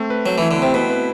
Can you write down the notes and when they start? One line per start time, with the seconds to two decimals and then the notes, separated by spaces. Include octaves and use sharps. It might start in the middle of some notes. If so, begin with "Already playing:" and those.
Already playing: A3 C4
0.10 B4
0.26 F#3 A3
0.38 E3
0.42 E4
0.51 D3
0.58 C3 C4
0.74 B2 B4
0.90 B4